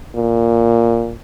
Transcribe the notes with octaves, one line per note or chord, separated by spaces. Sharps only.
A#2